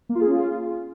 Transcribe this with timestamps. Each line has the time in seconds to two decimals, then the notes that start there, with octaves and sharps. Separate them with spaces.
0.09 A#3
0.15 F4
0.21 G#4
0.27 C#4
0.32 F4